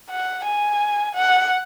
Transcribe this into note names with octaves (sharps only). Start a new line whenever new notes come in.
F#5
G#5
F#5